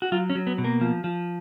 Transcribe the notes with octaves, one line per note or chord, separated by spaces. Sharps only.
F#4
F#3 F4
C#4
F#3
B3
B2
A#3
F3
F3